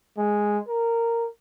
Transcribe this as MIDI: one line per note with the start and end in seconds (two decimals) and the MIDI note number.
0.18 0.59 56
0.69 1.27 70